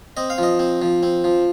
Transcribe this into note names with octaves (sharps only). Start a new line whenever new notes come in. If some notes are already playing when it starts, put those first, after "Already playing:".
C4 D#5
F5
F3 D#5
C4
F3
C4
F3